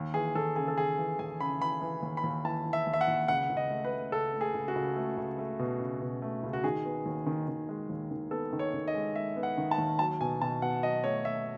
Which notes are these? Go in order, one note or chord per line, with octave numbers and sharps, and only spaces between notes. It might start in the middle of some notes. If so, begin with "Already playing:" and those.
Already playing: D#2
E3 G#4
D#2 A4
C#3 G#4
A4
C#3 G#4
E3
D#2 G#5
C#3 B5
E3 B5
E3
D#2
B5
D#2
E3 A5
E3
E5
D#2
E5
F#5
D#2
C#2 F#5
C#2
D#5
A3
B4
A3
C#2 A4
A3
G#4
C#2
F#4
C#2
A3
C#2
A3
B2
C#2
B2
A3
C#2
F#4
D#3 G#4
B3
D#2
D#3
D#3
G#3
D#2
D#3
B3 A4
D#3
C#5
D#3
D#5
G#3
G#3 E5
B3
F#5
D#3
A5
D#2
F#3 A5
B2 G#5
B2 A5
B2 F#5
F#3 D#5
A3 C#5
A3 E5